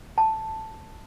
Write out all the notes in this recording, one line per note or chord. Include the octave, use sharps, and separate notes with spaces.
A5